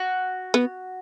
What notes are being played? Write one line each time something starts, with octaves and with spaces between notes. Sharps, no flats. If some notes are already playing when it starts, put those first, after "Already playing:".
Already playing: F#4
B3